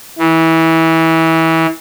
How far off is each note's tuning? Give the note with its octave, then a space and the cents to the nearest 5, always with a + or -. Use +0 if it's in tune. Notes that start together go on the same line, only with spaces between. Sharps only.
E3 -25